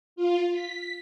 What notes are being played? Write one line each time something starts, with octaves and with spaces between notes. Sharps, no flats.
F4
B6